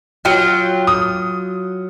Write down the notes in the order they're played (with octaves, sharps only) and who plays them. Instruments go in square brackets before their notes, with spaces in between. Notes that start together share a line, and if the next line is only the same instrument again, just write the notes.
[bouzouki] F#3 F4 [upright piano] G5
[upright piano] D#6